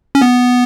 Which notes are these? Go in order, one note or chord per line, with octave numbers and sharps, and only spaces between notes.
C#4
B3